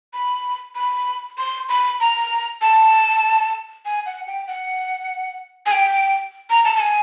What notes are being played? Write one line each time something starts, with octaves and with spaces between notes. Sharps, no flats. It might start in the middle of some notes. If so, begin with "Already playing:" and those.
B5
B5
C6
B5
A#5
A5
G#5
F#5
G5
F#5
G#5
G5
A#5
A5
A5
G#5